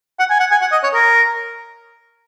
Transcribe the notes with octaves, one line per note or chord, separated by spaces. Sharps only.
F#5
G#5
F#5
G#5
F#5
D#5
C#5
A#4